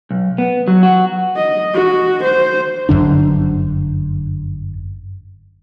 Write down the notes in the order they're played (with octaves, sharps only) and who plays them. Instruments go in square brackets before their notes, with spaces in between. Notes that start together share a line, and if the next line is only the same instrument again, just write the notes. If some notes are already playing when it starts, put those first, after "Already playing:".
[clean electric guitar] B1
B3
F#3
F#4
[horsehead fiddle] D#5
F#4
C5
[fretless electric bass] G1 F#2 D3 D4